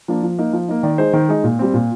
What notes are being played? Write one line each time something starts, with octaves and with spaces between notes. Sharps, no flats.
F3 A#3 D4
F3
A#3 D#4
F3
A#3 D#4
D#3 D5
G#3 D#4 C5
D#3
G#3 D#4
A#2
G3 C4
A#2